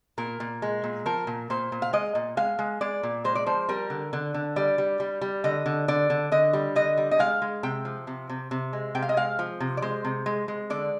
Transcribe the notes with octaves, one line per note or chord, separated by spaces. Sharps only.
A#2 A#4
A#2
G#3
A#2
F3 A#4
A#2
A#2 C5
A#2
F5
G#3 D#5
A#2
G#3 F5
G#3
G#3 D5
A#2
G#3 C5
D5
F3 C5
G3 A#4
D3
D3
D3
G3 D5
G3
G3
G3
D3 D#5
D3
D3 D5
D3
D3 D#5
G3
D3 D#5
G3
D#5
G#3 F5
G#3
C3 G5
F3
C3
C3
C3
G#3
C3 G5
F5
D#5
G#3 F5
F3
C3
D5
G#3 C5
C3
G#3
G#3
D3 D5